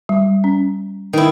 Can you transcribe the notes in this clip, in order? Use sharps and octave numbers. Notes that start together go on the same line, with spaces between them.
G3
C#4
D#3 E4